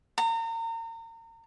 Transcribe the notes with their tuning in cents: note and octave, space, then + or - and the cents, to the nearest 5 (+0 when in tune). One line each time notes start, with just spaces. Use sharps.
A#5 -35